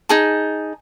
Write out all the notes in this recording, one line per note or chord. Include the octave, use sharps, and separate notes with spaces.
D#4 G#4 A5